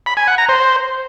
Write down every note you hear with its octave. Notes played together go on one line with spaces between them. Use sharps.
B5
G#5
F#5
A#5
C5